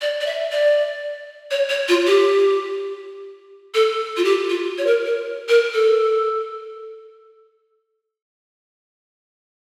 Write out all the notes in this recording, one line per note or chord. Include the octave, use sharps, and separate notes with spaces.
D5
D5
E5
D5
C#5
C#5
F4
G4
A4
F4
G4
F4
C#5
A#4
A#4
A#4
A4